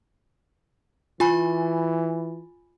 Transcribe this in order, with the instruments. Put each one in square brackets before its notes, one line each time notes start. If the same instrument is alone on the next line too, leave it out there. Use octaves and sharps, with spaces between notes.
[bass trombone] E3 [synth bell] F4 G#5 B5